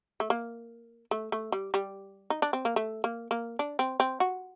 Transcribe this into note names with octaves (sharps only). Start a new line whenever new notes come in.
A3
A#3
A3
A3
G3
G3
D#4
D4
C4
A#3
A3
A#3
A#3
D4
C4
C4
F#4